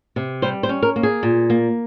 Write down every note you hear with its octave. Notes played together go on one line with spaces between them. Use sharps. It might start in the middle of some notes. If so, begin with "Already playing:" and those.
C3
G3 C5
C5
C#4
A#4
A#3
G#4
A#2
A#3